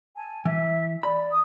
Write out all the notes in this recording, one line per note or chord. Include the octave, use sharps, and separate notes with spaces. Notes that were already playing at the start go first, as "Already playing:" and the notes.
G#5 A5
E3 E5
D5 B5
D#6